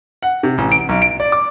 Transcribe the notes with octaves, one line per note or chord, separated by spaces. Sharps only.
F#5
C3
A1
D7
B1
D7
D5
D6